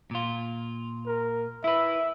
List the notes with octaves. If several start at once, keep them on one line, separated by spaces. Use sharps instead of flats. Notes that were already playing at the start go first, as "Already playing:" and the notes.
A#2 F4
A#4
E4 B4 E5